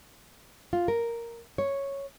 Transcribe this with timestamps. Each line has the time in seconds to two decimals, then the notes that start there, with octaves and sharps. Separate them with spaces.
0.73 F4
0.88 A#4
1.58 C#5